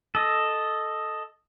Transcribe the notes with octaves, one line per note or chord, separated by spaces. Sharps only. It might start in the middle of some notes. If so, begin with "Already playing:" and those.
A4 D#5